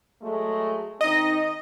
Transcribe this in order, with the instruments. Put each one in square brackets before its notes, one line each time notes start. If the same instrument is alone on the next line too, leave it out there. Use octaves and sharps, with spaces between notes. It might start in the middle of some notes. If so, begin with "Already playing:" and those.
[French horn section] F#3 G#3 A3
[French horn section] D#3 C4 D#4 [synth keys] D#5